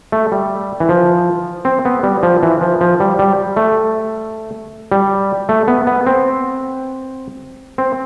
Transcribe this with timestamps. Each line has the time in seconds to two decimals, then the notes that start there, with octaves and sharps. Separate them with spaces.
0.12 A3
0.32 G3
0.80 E3
0.89 F3
1.65 C4
1.85 B3
2.03 G3
2.23 F3
2.43 E3
2.61 F3
2.81 F3
3.00 G3
3.19 G3
3.57 A3
4.92 G3
5.49 A3
5.68 B3
5.87 B3
6.07 C4
7.78 C4